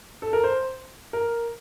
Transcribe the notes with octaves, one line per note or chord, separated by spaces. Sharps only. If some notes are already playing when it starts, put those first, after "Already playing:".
A4
A#4
C5
A#4